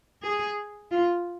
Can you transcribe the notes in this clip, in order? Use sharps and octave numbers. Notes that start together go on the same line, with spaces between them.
G#4
F4